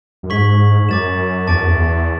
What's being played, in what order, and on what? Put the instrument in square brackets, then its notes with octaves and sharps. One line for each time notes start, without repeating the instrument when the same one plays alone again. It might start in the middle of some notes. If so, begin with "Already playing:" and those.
[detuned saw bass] F#2
[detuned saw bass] G#2 [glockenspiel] C#6 G#6 B6 F#7
[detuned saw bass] G#2
[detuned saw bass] F#2 [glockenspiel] D6 A6 E7
[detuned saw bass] E2 [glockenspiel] A5 D6 A6 D7
[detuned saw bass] F#2
E2